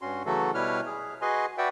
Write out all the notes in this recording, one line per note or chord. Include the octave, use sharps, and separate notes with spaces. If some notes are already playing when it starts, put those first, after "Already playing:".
G2 C#4 F#4 C6
C#3 E3 F#3 A3 F#4 A4
B2 G3 E4 B4 C#5 F6
G#4
F#4 G#4 B4 D#5 G#5 C6
F#4 B4 D5 E5 F#5 G5